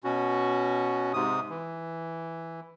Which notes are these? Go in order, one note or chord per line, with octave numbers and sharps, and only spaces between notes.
B2 C#4 F#4
G#2 C3 D#6
E3